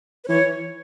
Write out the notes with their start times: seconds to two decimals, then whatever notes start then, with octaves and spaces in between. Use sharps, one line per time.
0.24 B4
0.28 E3 C#5